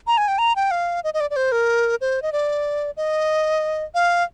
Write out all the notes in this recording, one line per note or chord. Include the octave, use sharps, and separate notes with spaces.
A#5
G#5
G5
A#5
G5
F5
D#5
D#5
D5
D5
C5
A#4
C5
D#5
D5
D#5
F5